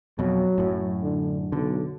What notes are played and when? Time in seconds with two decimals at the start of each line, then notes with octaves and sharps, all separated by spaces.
0.19 F2 B2 F#3
0.58 F#2 A2
1.03 D3
1.52 B1 D3